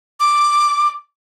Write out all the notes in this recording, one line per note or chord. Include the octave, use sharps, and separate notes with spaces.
D6